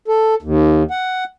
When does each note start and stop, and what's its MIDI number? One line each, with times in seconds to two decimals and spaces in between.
0.08 0.34 69
0.42 0.83 39
0.91 1.24 78